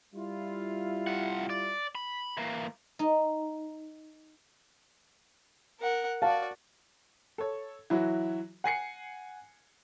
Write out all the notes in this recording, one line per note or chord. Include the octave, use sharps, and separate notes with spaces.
G3 E4 F4
C3 F#5
D5
B5
E3 A#3
D#4
A#4 F#5
F#4 D5 F5 A5
A4 C#5
E3 F#3 E4 F#4
F#5 G#5 C7 C#7